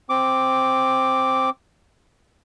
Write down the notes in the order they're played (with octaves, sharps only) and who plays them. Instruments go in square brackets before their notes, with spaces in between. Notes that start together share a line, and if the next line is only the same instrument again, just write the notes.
[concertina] C4 D6